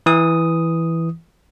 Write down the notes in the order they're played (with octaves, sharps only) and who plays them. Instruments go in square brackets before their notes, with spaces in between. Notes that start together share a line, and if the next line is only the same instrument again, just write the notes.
[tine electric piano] E3 D#6